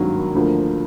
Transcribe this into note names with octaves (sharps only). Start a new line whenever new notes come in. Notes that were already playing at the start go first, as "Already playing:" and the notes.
Already playing: G#1 G2 D#3 F#3 A#3
D2 D3 F3 A#3